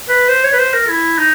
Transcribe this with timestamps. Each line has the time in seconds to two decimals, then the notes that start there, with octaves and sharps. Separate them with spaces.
0.09 B4
0.29 C5
0.44 C#5
0.53 B4
0.59 C5
0.74 A#4
0.88 E4
1.18 D#4